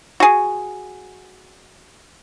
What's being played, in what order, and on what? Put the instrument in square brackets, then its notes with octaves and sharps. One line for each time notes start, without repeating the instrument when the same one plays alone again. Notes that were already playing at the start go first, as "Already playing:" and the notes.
[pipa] F#4 G#4